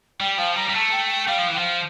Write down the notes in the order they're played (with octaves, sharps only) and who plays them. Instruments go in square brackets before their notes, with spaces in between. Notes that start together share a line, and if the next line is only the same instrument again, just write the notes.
[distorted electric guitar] G3 [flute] G5
[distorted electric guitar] F3 [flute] F5
[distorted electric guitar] G3 [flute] A#5
[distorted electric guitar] G3
[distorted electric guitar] A3 [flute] A5
[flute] G5
G5
[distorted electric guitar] G3 [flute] F5
[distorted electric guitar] F3
E3
[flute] G5
[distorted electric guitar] F3 [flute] F5